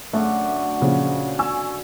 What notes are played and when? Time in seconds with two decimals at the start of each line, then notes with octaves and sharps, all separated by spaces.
0.13 F#2 D3 A3 F#4
0.81 A#2 C#3 F3
1.39 G#5 C#6 E6